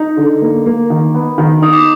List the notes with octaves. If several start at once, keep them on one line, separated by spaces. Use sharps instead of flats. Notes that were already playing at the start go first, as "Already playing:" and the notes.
Already playing: D#4
D3
A#3
A#3
D#3
B3
D#3
D#4 D#6
D6